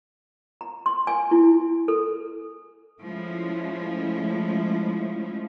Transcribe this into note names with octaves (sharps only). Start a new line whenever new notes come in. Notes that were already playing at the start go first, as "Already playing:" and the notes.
A#5
C6
G#5
E4
A4
F3 G#3 A3 C#4 E4